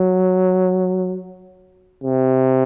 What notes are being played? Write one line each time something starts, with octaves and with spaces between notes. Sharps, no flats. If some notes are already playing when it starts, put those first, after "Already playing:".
Already playing: F#3
C3